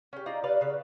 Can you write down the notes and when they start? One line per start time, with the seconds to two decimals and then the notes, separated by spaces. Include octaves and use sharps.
0.13 C#4 G4
0.26 D#4 F4 D5 A#5
0.44 G3 B4 D5 F5
0.61 C#3 B4